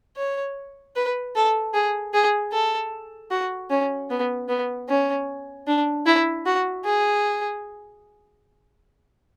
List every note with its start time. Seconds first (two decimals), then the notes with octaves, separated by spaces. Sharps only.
0.17 C#5
0.96 B4
1.35 A4
1.74 G#4
2.14 G#4
2.53 A4
3.31 F#4
3.71 C#4
4.10 B3
4.48 B3
4.89 C#4
5.67 D4
6.06 E4
6.46 F#4
6.85 G#4